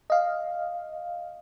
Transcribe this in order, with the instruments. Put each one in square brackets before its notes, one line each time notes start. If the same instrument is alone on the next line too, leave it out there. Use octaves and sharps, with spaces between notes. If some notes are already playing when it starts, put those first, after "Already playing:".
[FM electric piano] D#5 F5